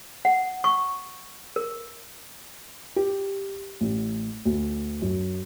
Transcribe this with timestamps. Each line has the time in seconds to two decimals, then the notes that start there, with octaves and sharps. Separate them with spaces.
0.25 F#5
0.64 C#6
1.56 A#4
2.96 G4
3.81 A1
4.45 D2
5.02 F#2